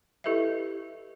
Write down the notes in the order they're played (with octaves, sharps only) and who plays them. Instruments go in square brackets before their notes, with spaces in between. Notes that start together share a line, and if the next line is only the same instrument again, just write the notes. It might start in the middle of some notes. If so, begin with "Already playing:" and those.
[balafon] E4 G4 A4 B4 D#5 E5